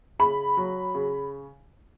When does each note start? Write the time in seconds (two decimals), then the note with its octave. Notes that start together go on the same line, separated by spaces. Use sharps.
0.19 C#3 B5
0.57 F#3
0.95 C#3